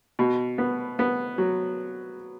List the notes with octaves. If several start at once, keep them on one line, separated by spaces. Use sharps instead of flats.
B2
B3
B3
F#3